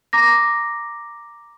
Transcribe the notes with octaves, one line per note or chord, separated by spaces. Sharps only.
A#5 D6 A#6